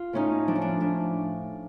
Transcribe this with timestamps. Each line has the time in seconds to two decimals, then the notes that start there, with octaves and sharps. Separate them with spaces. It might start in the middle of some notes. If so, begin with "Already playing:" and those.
Already playing: F4
0.13 A2 C#4 D#4
0.47 F3 D4
0.55 C#4
0.62 D4
0.80 A2 D4